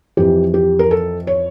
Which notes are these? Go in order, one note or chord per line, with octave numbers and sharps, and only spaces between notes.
F2 E3 G4
G4
A#4
A4
C#5